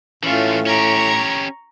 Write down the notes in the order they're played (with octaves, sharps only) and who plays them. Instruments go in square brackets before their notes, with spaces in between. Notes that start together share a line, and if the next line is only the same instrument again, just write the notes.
[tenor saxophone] A2 [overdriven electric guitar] E3 A3 [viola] C#4 F4
[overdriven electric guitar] C#4 G4 [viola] A#5 C#6